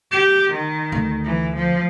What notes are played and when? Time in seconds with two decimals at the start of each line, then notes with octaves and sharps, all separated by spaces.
0.11 G4
0.52 D#3
0.92 D2
1.25 E3
1.56 F3